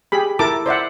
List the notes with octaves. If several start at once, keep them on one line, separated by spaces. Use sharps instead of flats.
G4 G#4 B5
E4 A4 A#4 A5 D6
C5 D5 E5 F#5